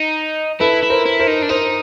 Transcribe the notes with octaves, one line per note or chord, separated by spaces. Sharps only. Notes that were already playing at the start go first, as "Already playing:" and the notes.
Already playing: D#4
E4 A4 B4
E4
A#4 C5
E4
A#4 C5
D#4
D4
D#4 A#4 C5